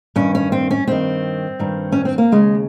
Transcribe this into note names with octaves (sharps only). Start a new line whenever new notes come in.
G2 D#3 C#4
C#4
C4
C#4
G2 D#3 C4
G2 D#3
C#4
C4
A#3
D#2 C#3 G#3